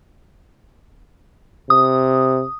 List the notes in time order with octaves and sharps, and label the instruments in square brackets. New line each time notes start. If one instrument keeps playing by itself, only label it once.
[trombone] C3 [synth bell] D#6